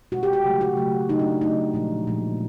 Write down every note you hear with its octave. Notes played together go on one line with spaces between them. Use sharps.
B2 G#3 F#4
G4
G4
C#3 F#3 A3
F#4
C#3 F#3 A3
C#3 F#3 A3 D#4
D4
C#3 F#3 A3 D#4
A#2 F3 G#3
A#2 F3 G#3